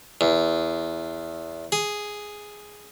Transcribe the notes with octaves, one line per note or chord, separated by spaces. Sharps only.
E2
G#4